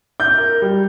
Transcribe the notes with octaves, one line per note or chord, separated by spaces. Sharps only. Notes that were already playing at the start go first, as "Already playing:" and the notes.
G6
A#4
G3